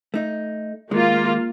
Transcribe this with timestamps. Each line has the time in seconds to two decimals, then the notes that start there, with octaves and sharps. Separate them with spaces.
0.14 A3 D#4
0.91 D#3 G#3 A#3 F4